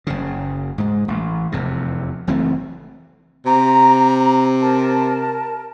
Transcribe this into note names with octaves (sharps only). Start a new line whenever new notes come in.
F#1 C#3
G#2 G#3
A1
F1 E2 C3
F#1 E3 A3 C4
C3 A#5
A#4 A5